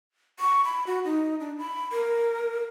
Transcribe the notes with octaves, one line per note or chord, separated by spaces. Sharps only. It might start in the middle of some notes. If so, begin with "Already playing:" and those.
C#6
B5
F#4
D#4
D4
B5
A#4